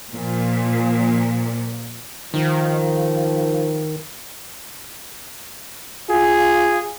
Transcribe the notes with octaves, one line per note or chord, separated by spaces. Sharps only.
A#2 F3
D#3 F3
F4 G#4